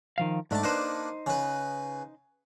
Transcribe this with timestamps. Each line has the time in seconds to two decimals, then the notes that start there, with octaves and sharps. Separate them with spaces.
0.18 D#3 F3 F5
0.51 G#2 A3 D4 A5
0.63 A#3 D4 D#4 B4 C5
1.26 C#3 B4